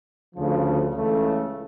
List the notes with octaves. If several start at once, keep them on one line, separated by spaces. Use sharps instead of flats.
D2 C#3 F3
C#2 C#3 E3 A3